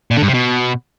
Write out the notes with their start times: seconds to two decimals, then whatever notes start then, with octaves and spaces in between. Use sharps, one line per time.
0.11 A#2
0.17 D3
0.22 G2
0.28 C3
0.34 B2